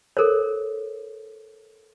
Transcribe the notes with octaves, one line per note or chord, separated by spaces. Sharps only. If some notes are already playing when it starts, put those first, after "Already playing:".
A4 A#4 C5 C#5